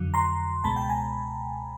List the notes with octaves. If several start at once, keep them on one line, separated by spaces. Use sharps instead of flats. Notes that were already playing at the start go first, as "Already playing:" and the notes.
Already playing: F2 D3 F#3
A#5 C6
C#2 B2 G#3 A5 B5
G5 A5
G#5 A#5